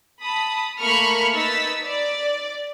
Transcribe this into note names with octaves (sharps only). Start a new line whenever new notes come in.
A5 B5 D#6
A3 A#3 B5 C#6 F6 C#7
D#4 B4 E6 A6 B6
D5